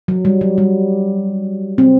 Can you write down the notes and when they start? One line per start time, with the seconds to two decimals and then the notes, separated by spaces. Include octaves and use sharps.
0.08 F#3
0.25 G3
0.41 F#3
0.58 G3
1.78 C4